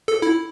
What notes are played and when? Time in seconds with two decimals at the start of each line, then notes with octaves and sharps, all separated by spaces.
0.08 A4
0.22 E4